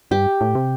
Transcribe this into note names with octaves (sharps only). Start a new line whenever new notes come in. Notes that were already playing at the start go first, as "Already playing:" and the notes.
G2 G4
A2
C3